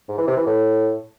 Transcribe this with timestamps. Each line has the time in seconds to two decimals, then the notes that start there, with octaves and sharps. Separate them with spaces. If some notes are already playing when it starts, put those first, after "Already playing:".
0.08 G#2
0.18 E3
0.28 C3
0.37 E3
0.47 A2